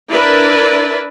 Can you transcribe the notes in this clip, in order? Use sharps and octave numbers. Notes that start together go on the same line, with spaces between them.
D4 E4 A#4 B4 D5